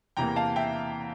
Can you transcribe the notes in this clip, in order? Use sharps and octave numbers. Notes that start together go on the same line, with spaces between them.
E2 C3 E3 A#3 G5 A#5
F5 A5
E5 G5